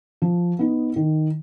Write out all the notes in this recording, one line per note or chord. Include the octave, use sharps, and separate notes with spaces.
F3
B3 D#4
D#3